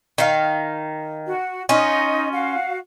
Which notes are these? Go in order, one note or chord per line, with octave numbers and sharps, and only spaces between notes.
D#3 F5
F#4
C#4 D#4 F4 D#5
F#4 F5